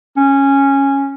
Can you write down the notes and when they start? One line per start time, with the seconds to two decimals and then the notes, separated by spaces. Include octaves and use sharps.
0.17 C#4